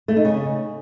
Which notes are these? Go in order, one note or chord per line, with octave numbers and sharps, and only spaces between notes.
A3
D#4
C#3